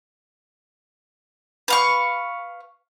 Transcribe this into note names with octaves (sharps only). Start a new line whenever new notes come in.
B4 F5 C#6